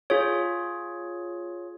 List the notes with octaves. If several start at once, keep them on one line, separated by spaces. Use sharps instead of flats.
F4 G#4 C#5